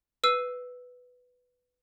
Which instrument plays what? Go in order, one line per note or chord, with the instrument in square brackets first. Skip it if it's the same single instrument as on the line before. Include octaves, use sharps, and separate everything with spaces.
[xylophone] B4 E6 C7 D#7